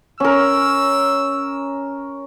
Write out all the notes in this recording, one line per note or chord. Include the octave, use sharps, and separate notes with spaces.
C#4 A#4 E6